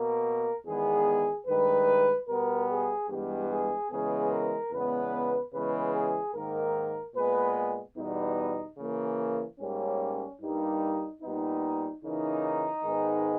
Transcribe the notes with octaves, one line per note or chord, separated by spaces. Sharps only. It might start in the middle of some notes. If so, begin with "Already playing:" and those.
Already playing: B2 A#3 A#4
E2 D#3 G#3 B3 G#4
G2 D#3 G#3 B4
B2 G3 B3 A#4
G#4
G2 E3 G#3 B3 G4
G#4
C#3 E3 G#3 B3 G#4
A#4
E2 C#3 G#3 B3 B4
C#3 E3 G#3 B3 B4
G#4
G#2 D#3 A#3 A#4
A#2 G#3 B3 B4
E2 B2 G3 B3 D#4
C#3 E3 A#3
G#2 G3 A#3 C#4
G2 G3 A#3 D#4
A#2 G3 B3 D#4
C#3 E3 A#3 D#4
G#2 D#3 G#3 B3